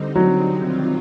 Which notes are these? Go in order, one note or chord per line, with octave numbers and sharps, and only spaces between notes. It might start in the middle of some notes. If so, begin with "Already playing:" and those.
Already playing: D3 G3 C4 D#4
F#3
C3 D#3 G3 C4 F4